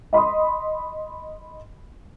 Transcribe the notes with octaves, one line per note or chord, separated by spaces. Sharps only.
D#5 B5 C6 D#6